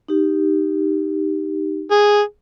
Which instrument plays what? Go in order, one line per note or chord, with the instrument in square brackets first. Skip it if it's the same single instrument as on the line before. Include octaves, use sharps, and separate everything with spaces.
[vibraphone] D#4 G4
[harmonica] G#4